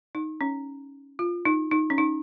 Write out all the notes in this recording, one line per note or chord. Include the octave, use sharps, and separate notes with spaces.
D#4
C#4
F4
D#4
D#4
C#4
D#4